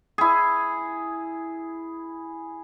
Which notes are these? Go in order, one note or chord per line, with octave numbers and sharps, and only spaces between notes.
E4 G#4